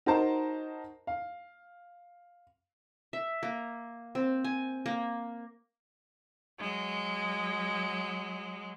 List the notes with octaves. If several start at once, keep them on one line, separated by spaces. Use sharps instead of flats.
D#4 F#4 A#4 C5 A5 A#5
F5
E5
A#3
C4
G#5
A#3
F#3 G#3